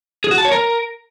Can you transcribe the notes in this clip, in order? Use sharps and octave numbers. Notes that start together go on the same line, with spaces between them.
G#4
F#4
A5
C#5
A#4